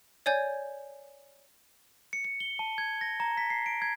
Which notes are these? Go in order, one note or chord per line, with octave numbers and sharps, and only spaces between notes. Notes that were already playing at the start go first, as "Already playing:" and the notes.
C#5 D5 G#5 G6 G#6
C#7
C#7
G7
A5
G#6
A#6
A#5
B6
C7
D7
G#6